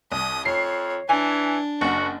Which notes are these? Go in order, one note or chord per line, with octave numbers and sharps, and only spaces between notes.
C2 D#6
F2 C#5 C7
E3 D4 G#5
F#1 F#4 F#5